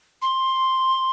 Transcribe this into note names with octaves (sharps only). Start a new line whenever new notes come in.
C6